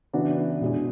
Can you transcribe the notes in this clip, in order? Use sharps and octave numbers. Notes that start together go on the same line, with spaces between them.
C#3 E3 B3 D4 F#4
B2 G#3 D4 G#4